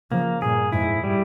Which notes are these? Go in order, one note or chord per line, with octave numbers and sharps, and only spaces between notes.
C#3 F3 A#3
G2 A#2 G#4
F2 G#2 E4
G3